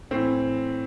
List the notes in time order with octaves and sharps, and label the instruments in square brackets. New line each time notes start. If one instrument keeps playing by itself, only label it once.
[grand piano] A2 E3 C4